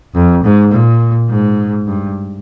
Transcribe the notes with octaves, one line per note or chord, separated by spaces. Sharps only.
F2
G#2
A#2
G#2
G2